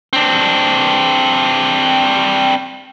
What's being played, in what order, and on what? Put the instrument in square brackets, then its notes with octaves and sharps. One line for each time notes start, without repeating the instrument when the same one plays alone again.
[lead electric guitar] C4 D4